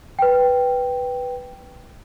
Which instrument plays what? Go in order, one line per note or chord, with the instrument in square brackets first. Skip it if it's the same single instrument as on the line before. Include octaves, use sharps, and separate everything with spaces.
[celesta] B4 G5